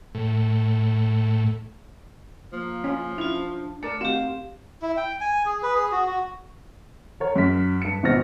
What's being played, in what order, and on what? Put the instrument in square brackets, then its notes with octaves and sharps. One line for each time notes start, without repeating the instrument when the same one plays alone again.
[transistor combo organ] A2
[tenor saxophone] F3 [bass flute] A#3
[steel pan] C#4 F4
[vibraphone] C#4 F4 [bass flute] D4 [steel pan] E4
[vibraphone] A5
[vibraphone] A3 [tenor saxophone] D4 [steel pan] A#4 A5 [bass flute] D5
[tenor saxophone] D#3 [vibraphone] C4 G4 [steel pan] F#4 [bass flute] F5
[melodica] E4
G5
G#5
G#4
B4
G#4
F#4
F#4
[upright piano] A#4 C#5
F#2 B6
G2 C#7
G#1 B2 C4 F6 A#6